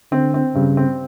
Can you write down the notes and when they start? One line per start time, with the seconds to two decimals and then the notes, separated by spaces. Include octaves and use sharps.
0.12 D3 C4
0.34 C4
0.55 G2 C#3
0.77 C4